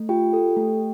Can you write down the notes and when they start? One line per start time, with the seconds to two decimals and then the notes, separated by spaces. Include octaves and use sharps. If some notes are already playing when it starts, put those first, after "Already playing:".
Already playing: A3
0.09 F4 G4 G5
0.33 A4
0.57 A3